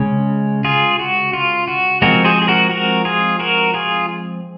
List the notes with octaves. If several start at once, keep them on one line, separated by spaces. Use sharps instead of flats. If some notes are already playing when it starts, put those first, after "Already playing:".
Already playing: C#3 G#3 C#4
F4 G#4
F#4
F4
F#4
F3 G#3 C4 F#4 A#4
G#4 C5
G#4
F#4 A#4
F#4 A#4
F4 G#4
F#4 A#4
F4 G#4